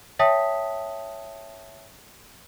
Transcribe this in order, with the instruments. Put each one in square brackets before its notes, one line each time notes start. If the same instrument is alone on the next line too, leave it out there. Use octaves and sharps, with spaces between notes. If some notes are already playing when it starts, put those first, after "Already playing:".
[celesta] C#5 E5 G5 A5 D#6 B6